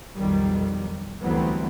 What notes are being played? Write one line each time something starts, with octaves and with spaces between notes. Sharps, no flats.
B1 F2 D#3 G3
D2 E3 F#3 G3 B3 C4